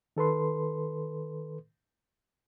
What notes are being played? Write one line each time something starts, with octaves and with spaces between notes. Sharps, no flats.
D#3 A4 B4 C6